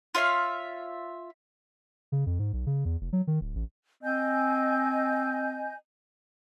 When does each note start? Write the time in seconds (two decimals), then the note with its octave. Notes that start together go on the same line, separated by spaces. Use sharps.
0.15 F4 C#5 E5 F5
2.12 C#3
2.26 F2
2.39 G#2
2.53 B1
2.66 C#3
2.85 E2
3.01 F1
3.13 F#3
3.27 D#3
3.41 D1
3.55 A1
4.03 C4 D#5 G#5 G6